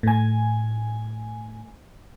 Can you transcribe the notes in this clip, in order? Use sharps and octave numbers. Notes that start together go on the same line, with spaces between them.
A2 G#5